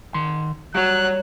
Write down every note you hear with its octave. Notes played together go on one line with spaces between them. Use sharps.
D#3 C6
F#3 G3 C#5 F#6